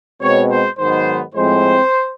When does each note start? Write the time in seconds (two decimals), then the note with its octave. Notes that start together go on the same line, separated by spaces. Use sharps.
0.21 B2 G#3 C4 C#5
0.49 C5
0.77 G#2 D#3 F#3 B3 C5
1.34 A2 F3 G#3 C4 C5